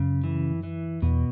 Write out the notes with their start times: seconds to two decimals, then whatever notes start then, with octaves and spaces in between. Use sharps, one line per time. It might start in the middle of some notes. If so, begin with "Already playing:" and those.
Already playing: F#2 C#3
0.24 E3
0.63 E3
1.02 E2 B2